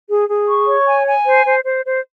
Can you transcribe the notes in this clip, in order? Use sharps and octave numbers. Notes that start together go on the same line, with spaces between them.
G#4
G#4
C#6
C#5
G#5
G#5
C5
C5
C5
C5